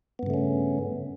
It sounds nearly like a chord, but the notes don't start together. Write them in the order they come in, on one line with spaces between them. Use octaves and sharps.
B3 G2 C#3 A3 C#4